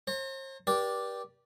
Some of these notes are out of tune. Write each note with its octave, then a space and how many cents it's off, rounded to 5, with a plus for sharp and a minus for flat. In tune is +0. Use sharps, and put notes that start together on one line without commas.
C5 +40 A#5 -40
G4 -5 B4 -40 D5 +0